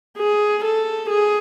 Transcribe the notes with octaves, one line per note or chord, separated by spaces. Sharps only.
G#4
A4
G#4